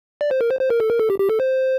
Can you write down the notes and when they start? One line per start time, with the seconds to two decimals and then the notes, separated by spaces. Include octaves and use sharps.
0.21 D5
0.31 C5
0.41 A#4
0.51 C5
0.61 C5
0.70 A#4
0.80 A4
0.90 A#4
1.00 A4
1.10 G4
1.20 G4
1.30 A4
1.40 C5